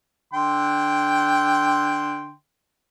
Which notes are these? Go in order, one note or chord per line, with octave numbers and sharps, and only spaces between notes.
D3 G5 C6